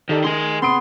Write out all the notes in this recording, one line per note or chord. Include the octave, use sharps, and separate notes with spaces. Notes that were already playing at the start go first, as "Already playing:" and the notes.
D#3 G4 A4 D5
D#3 G#4 G#5 C6
C3 B3 C6 D#6 D7